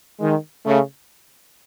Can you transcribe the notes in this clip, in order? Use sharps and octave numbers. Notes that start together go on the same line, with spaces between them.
D#3 G#3
C#3 A3